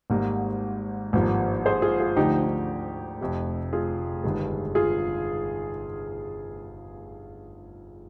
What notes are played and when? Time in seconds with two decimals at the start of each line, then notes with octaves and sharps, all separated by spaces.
0.10 G#1 G#2 G3 A#3
1.13 G#1 G2 F3 A#3
1.66 G#4 C5
1.82 F4 G#4
2.00 F4 G#4
2.16 D2 D3 F3 D#4 G4
2.43 D#4
3.21 F1 F2 C3
3.73 F4 G#4
4.24 G1 G2 D#3 G#3
4.75 F4 G#4